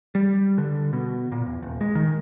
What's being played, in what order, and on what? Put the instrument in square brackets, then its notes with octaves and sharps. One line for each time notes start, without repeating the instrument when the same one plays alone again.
[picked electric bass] G3
D3
B2
A#2
E2
D#1
G#3
D#3